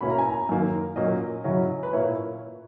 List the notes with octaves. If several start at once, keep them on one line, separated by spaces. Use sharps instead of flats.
B2 A#3 C#4 E4 B5
A#5
G#5
A#5
F#2 D#3 A#3
A#2 F#3 A#3 C#4 D#5
C#3 F#3 C#4 E4
B4
A#2 A#3 E4 C#5